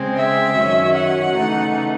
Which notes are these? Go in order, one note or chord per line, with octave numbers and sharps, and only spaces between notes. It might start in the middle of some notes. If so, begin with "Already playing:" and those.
Already playing: C#3 G#3 C4
E5
F#2 D#3 F#3 C#4
F#5
C#3 E3 A3 D#4